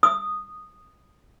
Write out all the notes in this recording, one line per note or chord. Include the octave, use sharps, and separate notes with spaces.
D#6